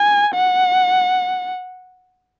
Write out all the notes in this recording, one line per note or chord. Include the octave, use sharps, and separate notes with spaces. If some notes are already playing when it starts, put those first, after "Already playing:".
Already playing: G#5
F#5